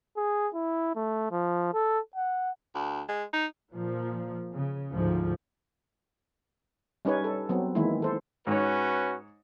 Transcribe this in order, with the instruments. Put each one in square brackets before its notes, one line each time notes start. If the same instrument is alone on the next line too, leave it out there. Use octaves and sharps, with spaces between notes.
[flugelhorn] G#4
E4
A3
F3
A4
F#5
[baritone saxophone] D2
G#3
D#4
[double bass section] A#2 F3
C#3
D2 G#2 F3
[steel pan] G3 C#4 D#4 B4 C#5
A4
F#3 B3 C4
D#3 E3 G#3 A#3 E4
A4 C5
[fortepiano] G#2 C#5 [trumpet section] C#4 F#4 B4